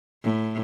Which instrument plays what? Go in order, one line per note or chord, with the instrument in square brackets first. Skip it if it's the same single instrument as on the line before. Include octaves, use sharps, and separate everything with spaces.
[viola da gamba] A2